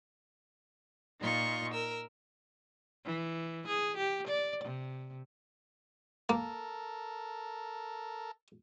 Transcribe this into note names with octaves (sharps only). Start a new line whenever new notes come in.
A#2 D#4 F4 C#6
A#4 E6
E3
G#4
G4
D5
C3
A#3 A4 A#4